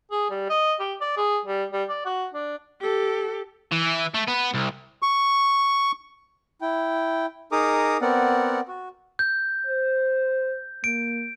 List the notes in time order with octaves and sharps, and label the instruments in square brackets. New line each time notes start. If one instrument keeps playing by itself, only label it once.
[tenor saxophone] G#4
G3
D#5
G4
D5
G#4
G3
G3
D5
F#4
D4
[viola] G4 A4
[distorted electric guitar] E3
A3
B3
C2
[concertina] C#6
[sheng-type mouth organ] E4 G5
D#4 G#4 A#4 A#5 D6 D#6
B3 C4 A#4 D5 F#5
F#4
[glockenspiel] G6
[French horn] C5
[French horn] A#3 [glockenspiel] D7